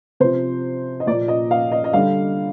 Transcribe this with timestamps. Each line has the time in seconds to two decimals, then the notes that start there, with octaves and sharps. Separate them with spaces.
0.20 C3 F3 C5
1.00 D#5
1.07 A#2 D5
1.10 F3
1.28 D#5
1.51 F5
1.72 D#5
1.84 D#5
1.93 D3 G3 F5